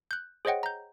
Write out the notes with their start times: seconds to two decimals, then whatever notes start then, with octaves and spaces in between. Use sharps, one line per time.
0.11 F#6 G6
0.45 G#4 C5 C#5 D#5 F#5 G5
0.63 A#5 G6